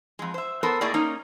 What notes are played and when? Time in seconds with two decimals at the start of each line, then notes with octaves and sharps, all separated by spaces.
0.19 F2 G#3
0.34 C5 E5
0.63 B3 A4 A#4 C5
0.81 A2 A3 A#3 G#4 D5 D#5
0.94 A#3 C#4 D#4 A#5